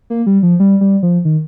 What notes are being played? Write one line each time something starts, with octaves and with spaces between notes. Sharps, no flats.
A#3
G3
F3
G3
G3
F3
D#3